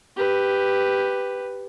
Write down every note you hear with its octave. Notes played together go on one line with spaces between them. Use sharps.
G4 B4